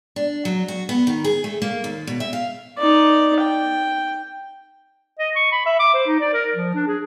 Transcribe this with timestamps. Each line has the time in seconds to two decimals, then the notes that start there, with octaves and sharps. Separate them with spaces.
0.16 D4
0.45 F#3
0.68 F#4
0.89 B3
1.07 D#3
1.24 G#4
1.44 A3
1.62 A#3
1.84 D#2
2.07 B2
2.20 E5
2.33 F5
2.79 D#4 D5
3.40 G5
5.19 D#5
5.36 C#6
5.52 B5
5.66 E5
5.79 D6
5.94 C5
6.07 D#4
6.20 D5
6.33 A#4
6.55 F3
6.75 D4
6.87 G#4